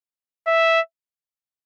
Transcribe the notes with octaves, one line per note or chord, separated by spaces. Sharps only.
E5